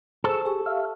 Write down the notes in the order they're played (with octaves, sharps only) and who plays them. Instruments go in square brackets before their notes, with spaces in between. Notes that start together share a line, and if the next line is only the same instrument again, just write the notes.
[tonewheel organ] G#4 C#6 E6 [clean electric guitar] A4 [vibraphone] C5
[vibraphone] G4 C#6 [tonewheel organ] G#4
[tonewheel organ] E5 F5